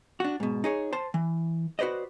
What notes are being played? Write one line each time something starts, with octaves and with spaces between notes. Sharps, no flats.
D4 F#4
G#2 B2
D#4 G#4 C#5
C5 A5
E3
F#4 B4 C5 D5 D#5